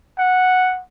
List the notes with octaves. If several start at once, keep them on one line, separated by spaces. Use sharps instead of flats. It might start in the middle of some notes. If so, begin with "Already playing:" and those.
F#5